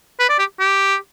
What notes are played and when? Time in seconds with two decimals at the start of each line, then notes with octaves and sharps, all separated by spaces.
0.20 B4
0.29 D5
0.39 G4
0.60 G4